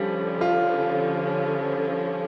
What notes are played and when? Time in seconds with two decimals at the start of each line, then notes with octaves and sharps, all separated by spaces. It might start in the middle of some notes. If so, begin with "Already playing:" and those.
Already playing: D3 F3 G3 C#4
0.41 F4